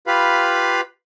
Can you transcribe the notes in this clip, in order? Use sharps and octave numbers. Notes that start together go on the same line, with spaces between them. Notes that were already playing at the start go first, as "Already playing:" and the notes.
F4 G4 B4 F5 B5